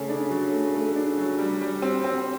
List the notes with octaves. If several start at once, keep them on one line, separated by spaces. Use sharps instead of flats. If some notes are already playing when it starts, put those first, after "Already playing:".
Already playing: C#3 A3
D4
F#3
A3
A3
D4
F#3
G3
G3
C4
C4